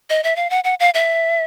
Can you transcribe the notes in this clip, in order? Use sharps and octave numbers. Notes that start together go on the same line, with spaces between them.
D#5
E5
F5
F#5
F#5
F5
E5